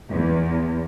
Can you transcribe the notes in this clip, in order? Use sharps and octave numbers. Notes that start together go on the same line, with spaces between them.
E2